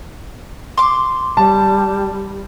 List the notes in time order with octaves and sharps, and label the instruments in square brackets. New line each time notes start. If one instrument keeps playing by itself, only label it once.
[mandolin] C6 D6
[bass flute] G3 [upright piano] A5